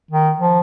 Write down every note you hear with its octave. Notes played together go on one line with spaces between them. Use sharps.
D#3
F3